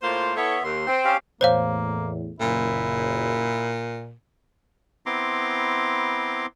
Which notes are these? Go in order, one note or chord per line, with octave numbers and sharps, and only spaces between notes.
A2 A#3 F4 C5
B3 E4 A4 C#5 E5
D#2 C6
C4
C#4 G4 F5
E2 A2 A#3 C5 C#5 F5
F#1 A#2 E4
B3 C4 E4 A#5 C6 D6